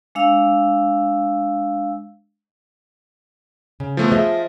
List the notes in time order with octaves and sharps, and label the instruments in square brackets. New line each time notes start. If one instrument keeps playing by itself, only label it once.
[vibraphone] G#3 D4 F5 E6
[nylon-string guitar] C#3
[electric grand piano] F3 A3 B3
[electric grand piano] F3 [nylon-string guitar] G#4 D#5 E5